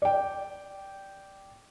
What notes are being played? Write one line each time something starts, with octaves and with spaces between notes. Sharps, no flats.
D5 G5